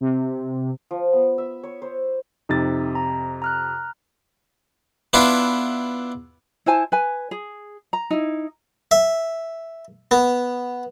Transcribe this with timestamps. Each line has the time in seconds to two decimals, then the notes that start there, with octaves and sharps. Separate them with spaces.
0.01 C3
0.91 F3
1.13 B3
1.38 E5
1.63 C#5
1.82 C5
2.49 F2 C3 D#4 A6
2.95 A#5
3.42 A#5 F6 F#6
5.13 B3 D4 E4 F4
6.66 E4 C5 G#5 A5
6.92 B4 G#5
7.31 G#4
7.93 A#5
8.10 D#4 E4
8.91 E5
10.11 B3